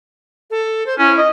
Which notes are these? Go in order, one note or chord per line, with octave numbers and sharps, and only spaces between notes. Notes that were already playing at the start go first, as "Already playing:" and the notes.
A4
C5
C#4 E4
D#5